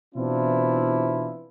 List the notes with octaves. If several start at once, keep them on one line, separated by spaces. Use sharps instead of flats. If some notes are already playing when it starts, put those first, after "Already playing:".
B2 E3 C4 D4 E4 F4